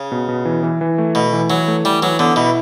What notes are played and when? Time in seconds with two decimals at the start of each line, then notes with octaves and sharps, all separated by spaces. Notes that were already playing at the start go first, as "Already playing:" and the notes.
Already playing: C#3
0.12 B2
0.29 B2
0.45 E3
0.63 E3
0.81 E3
0.98 A3
1.15 B2 A3
1.33 E3
1.50 E3 F#3
1.68 A3
1.85 E3 G3
2.02 E3 F#3
2.19 D3 B3
2.36 B2 E4